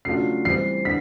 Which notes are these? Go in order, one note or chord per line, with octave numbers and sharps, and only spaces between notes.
C#3 F#3 A3 D4 F4 C7
E3 G3 C4 C7
D3 B6